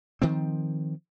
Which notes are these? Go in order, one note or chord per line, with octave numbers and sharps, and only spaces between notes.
D#3 F3 C4